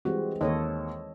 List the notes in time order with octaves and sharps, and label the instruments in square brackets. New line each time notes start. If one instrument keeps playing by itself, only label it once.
[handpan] E3 G#3 C4 [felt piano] G3 F#4
[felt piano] D#2 [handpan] A4 C#5 D#5